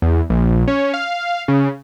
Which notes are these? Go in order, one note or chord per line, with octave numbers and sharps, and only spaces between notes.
E2
A#1
C#4
F5
C#3